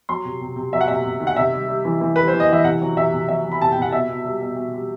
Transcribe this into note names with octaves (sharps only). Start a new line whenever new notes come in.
F#3 C6
C3
C3
C3
F#3 E5
F#5
C3 E5
C3
D#3
F#5
C3 E5
G3
G3
E3
E3
G3 B4
C5
E3
D#5
E3 E5
C3 F#5
F#3
C3 E5
C3
F#3 E5
F#3
B5
C3 A5
G5
C3 F#5
B2 E5
B2
G3
B2
B2
G3